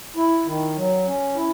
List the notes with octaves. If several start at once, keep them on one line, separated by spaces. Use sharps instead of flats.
E4
D#3
F#3
C#4
E4